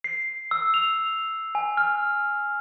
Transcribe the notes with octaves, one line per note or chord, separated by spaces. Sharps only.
C7
E6
F7
G#5
F6